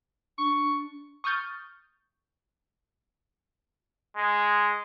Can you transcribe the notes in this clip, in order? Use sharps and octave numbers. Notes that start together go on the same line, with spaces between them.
D4 C#6
C#6 D#6 F6 G6 A6
G#3